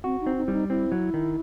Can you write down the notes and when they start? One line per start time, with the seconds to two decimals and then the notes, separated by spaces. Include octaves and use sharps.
0.04 C4 F#4
0.21 D#4
0.27 C4
0.38 D#4
0.46 G3 E4
0.53 D#4
0.69 C4 E4
0.92 F#3
1.14 D#3